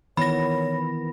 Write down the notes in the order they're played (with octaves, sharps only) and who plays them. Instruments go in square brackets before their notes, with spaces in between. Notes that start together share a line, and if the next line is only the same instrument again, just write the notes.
[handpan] D#3 E3 B3 [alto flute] C#5 [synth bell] B5 A#6